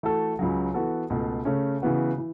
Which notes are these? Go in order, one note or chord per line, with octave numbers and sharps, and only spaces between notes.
E3 A3 F#4 A4
C#2 C#3 F#3
E3 B3 F#4 A4
C#2 B2 A3
C#3 A3 C#4
C#3 E3 B3 F#4
E3